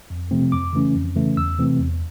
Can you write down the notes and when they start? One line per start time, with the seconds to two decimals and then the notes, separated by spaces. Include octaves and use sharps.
0.10 F2
0.31 C3 F3 A3 C4
0.52 F2 D6
0.73 C#3 E3 A3 C#4
0.95 F2
1.15 C#3 E3 A3 C#4
1.37 E2 E6
1.58 C3 E3 A3 C4
1.79 E2